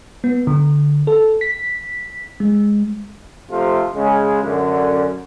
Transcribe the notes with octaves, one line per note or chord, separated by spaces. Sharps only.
B3
D3
A4
B6
G#3
C3 F3 A3 F4
C#3 G#3
F#2 D3